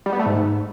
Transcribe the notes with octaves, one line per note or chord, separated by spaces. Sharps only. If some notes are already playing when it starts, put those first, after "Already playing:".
G3
B3
A3
G#2